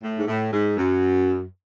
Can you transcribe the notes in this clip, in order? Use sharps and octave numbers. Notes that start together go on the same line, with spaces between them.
A2
G#2
A2
G#2
F#2